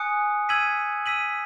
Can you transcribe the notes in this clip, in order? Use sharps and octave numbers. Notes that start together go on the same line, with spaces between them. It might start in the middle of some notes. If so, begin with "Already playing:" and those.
Already playing: G#5 D#6 F#6 C#7
E6 G#6 B6 D#7 F#7
E6 B6 D#7 F#7